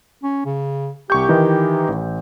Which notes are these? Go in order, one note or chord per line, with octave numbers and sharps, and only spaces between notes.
C#4
C#3
C2 G4 C#6 G6
D#3 E3 D#4
A1